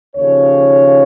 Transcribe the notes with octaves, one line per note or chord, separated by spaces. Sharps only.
D#2 C#3 F3 C#5